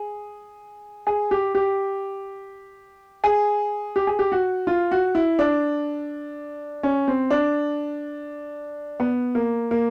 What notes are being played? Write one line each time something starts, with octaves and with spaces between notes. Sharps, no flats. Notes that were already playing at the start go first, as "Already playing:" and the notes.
Already playing: G#4
G#4
G4
G4
G#4
G4
G#4
G4
F#4
F4
F#4
E4
D4
C#4
C4
D4
B3
A#3
A#3